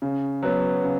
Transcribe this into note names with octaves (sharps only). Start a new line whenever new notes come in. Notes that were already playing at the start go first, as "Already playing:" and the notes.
C#3
F#3 B3
C#3